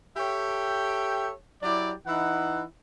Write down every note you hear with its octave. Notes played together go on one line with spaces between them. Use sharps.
G4 A4 C#5 E5 G5
F#3 E4 G4 D5
E3 D#4 E4 F#5